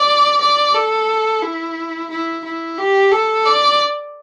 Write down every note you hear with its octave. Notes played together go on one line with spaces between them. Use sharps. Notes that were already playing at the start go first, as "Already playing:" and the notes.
Already playing: D5
D5
A4
E4
E4
E4
G4
A4
D5